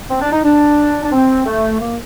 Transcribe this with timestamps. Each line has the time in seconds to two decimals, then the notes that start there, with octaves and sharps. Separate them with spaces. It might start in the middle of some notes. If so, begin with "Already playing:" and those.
0.10 C4
0.21 D4
0.32 D#4
0.44 D4
1.03 D4
1.12 C4
1.46 A3
1.80 A#3